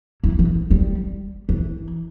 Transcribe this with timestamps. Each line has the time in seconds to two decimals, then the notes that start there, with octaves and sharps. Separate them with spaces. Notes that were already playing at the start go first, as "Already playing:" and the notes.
0.24 E3
0.39 E3
0.71 G3
1.49 E3